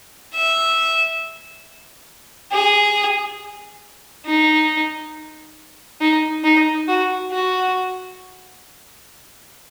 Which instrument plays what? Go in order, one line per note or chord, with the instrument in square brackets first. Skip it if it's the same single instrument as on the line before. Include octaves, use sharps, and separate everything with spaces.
[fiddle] E5
G#4
D#4
D#4
D#4
F#4
F#4